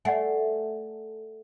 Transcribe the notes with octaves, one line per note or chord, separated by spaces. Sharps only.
A3 D5 F#5 G#5